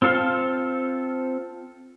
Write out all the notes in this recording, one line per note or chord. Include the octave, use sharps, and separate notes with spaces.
C4 F4 A4 F5